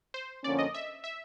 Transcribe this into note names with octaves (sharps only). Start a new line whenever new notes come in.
C5
F2 D3 F3 A#3 C#4 D5
D#5
E5
E5